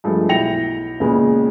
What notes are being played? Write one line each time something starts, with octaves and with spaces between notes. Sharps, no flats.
G2 F3 G#3 A3
B1 E4 G5 A#6 C#7 F7
C#2 A#2 C#3 G#3 B3